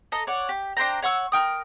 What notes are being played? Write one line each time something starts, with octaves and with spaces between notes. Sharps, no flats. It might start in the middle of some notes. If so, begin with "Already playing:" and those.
A4 D#5 A#5
C#5 D5 F#5
G4
D4 C5 G5 A#5
C#5 F#5 C#6 E6
A#4 G5 D#6